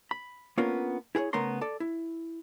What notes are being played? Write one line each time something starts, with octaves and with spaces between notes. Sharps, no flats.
B5
A#3 B3 C#4 D4 F4 A#4
E4 G#4 B4 C#5
C#3 A3 B3 A#4 A#5 C6
A4 D5
E4